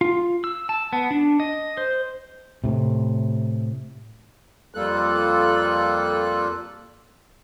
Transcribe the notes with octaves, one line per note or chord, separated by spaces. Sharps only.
F4
E6
A5
B3
D4
D#5
C5
A2 C3
F2 G3 A#3 F4 A4 F#6